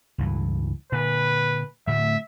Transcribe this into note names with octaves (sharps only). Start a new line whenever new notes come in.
C#2 G2 E3
A#2 D3 B4
A2 D3 A3 E5